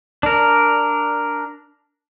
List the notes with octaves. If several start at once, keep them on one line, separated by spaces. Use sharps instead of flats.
D4 A#4